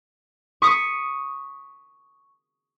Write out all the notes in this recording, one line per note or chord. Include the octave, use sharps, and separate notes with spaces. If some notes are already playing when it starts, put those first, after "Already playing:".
C#6 D#6 B6